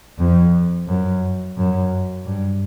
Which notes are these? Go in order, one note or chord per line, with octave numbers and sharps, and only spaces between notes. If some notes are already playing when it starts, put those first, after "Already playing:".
F2
F#2
F#2
G2